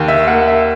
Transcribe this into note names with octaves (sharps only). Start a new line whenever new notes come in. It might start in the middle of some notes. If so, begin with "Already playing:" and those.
Already playing: D#2 D#3
E5
A#3 F#5
E5